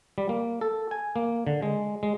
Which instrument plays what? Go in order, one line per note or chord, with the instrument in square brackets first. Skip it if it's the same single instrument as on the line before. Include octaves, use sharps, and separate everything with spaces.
[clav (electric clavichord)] G3
A#3
A4
G#5
A#3
D3
G#3
G#3